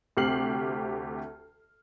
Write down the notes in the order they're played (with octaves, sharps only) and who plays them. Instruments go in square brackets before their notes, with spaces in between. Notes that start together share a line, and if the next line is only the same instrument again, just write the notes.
[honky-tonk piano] D2 C3 G4 F6 C7 F#7